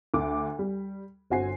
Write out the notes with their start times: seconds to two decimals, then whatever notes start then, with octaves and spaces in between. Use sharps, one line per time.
0.14 D2 D6
0.59 G3
1.30 G1 C4 F#4 G#5 C7